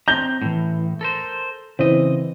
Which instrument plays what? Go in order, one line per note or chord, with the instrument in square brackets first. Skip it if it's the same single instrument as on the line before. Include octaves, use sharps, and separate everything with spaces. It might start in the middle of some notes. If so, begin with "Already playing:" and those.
[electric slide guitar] C4 A#5 [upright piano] G6 A#6 G7
[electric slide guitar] A2 E3
A4 A#4 C5
[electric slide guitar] C#3 D#5 [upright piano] E3 C4